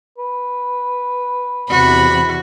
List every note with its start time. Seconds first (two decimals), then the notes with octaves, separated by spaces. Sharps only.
0.18 B4
1.70 E2 C3 F#4 B5